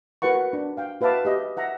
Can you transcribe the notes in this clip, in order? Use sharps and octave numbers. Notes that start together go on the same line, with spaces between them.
F#4 A#4 B4 F#5 C#6
D4
F5 G5
F#4 B4 E5 F5 A5 D6
G4 D#5 E5
E5 F#5 A#5